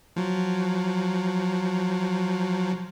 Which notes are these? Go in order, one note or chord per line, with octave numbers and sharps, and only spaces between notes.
F3 F#3